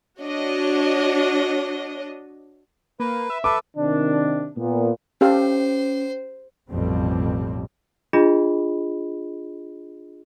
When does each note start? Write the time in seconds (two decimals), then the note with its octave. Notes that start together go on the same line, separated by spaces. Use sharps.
0.21 D4 F#4 C#5 D#5
3.00 A#3 B4
3.30 E5
3.44 A4 B4 D6
3.77 C3 D#3 D4
4.57 A#2 B3
5.21 C#4 G4 A4 C5 F5
6.70 A1 F2 B2 G3 C4
8.13 D4 F4 G#4 D#5 B5